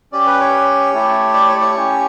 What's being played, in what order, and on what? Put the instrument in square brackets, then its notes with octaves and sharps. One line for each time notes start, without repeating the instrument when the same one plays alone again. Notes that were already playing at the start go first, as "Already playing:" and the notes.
[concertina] C#4 G4 D5
B4
C#5
A3 E4 G4
D5
C#5
C#5
C#4 G4